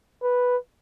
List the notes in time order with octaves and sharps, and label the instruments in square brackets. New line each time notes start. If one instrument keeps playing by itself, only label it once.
[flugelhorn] B4